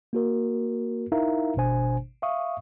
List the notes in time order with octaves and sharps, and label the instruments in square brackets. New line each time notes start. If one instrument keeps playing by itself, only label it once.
[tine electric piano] A#3 F#4 A#4
D#4 E4 A#4 E5 F5 A#5
G#1 B2 D4 C5 G#5
E5 F5 C#6 D#6